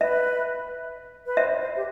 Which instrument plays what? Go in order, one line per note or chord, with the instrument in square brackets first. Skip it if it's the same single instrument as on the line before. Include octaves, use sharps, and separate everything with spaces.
[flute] B4 [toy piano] E5
[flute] B4
[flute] C5 [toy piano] E5
[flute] D5
C5
G4